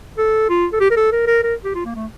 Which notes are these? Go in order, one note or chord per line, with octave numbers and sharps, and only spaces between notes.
A4
F4
A4
G4
A#4
A4
A#4
A#4
A#4
G4
F4
A#3
A3